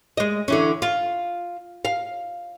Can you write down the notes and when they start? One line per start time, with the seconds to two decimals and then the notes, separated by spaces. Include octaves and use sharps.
0.17 G#3 D#5
0.48 D3 E3 C#4
0.82 F4
1.85 F5